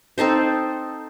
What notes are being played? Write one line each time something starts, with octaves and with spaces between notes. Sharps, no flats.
C4 D#4 A4 C5